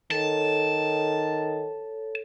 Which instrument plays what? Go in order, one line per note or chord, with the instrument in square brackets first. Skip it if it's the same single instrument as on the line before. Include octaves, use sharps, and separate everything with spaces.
[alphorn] D#3 [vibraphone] A4 C#5 [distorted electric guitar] A5